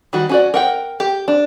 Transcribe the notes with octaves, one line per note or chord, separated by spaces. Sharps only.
D#3 G3 F#4
C#4 F#4 D5
A#4 F#5 G5
G4
D4